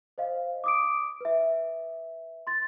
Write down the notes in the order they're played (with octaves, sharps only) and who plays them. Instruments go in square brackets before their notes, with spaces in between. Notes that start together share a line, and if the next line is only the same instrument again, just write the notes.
[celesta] C5 D#5 F5
D6 D#6 D7
B4 E5
C6 A6